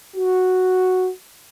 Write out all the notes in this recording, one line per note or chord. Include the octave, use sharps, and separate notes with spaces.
F#4